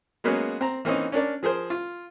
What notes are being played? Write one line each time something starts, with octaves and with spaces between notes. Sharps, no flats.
F#3 G#3 A#3 B3 C#4 G#4
C4 A#5
E3 A#3 C4 C#4 D#4
C#4 D4 A#4 D5
F3 G#4 A#4 C5
F4